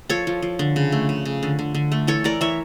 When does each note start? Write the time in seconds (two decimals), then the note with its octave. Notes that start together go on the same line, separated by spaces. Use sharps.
0.10 F3 A4 C#5
0.27 F3
0.42 F3
0.59 D3
0.76 C#3
0.92 A3
1.09 C#3
1.25 C#3
1.43 D3
1.59 D3
1.75 D3
1.92 A3
2.07 E3 A4 C#5
2.24 E3 A#4 D5
2.41 E3 C#5 E5